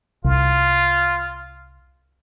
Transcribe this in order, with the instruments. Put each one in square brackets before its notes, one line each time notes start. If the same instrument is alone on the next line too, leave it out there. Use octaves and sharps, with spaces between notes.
[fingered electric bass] C2 [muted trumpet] F4